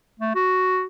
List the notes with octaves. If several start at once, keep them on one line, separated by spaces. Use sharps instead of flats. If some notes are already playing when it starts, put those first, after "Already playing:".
A3
F#4